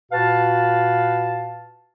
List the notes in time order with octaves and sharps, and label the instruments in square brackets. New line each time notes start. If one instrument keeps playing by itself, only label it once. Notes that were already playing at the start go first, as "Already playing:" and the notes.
[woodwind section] A#2 F#4 B4 F5 A5